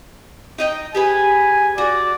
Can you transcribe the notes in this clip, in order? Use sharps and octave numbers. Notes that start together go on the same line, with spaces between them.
D#4 D#5 G5
G4 G#4 B4 G#5
F#4 D5